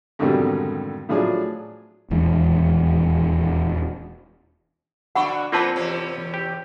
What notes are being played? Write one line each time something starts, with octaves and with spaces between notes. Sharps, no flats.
F2 G#2 B2 D3 D#3 G3
A2 F3 F#3 D4 G#4
D#1 E2 E3 G#3
D3 D4 F#4 F#5 B5 C#6
F3 A3 A#3 C4 F4 B4 C5 A5
E2 C3 C#4
G4